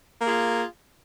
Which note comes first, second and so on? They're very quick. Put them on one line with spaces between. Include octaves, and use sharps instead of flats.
A#3 G#4 F4